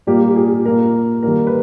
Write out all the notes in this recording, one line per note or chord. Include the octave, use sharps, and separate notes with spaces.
A#2 G3 A#3 G4
G4
G#4
A#2 A#3 A#4
D#3 G3 A#3 A#4
B4